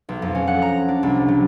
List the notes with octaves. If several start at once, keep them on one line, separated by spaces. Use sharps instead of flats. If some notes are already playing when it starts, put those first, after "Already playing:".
B1
F2
C#4
F#5
A#5
D4
C2
F#3